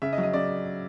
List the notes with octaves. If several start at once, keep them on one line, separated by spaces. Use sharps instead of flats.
C#3 E5
D#5
F#3
D#5
C#3 D5